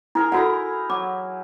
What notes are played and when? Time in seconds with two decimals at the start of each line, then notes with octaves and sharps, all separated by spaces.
0.15 E4 G#4 A#4 A#5
0.32 D#4 E4 F#4 A4 F#5 A#5
0.90 F#3 D6